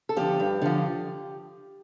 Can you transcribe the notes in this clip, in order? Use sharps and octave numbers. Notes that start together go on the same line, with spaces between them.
A4
D3 F3 G4
G2
D3 F3